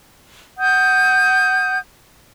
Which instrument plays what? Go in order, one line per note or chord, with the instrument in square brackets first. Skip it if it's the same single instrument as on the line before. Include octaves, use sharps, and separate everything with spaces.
[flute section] F#5 D#6 G6